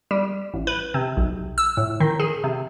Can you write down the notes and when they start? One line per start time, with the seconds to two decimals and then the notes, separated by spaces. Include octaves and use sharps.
0.11 G3
0.54 A1
0.67 B4
0.94 C3
1.17 B1
1.58 E6
1.77 A2
2.00 D#3
2.20 G#4
2.44 C3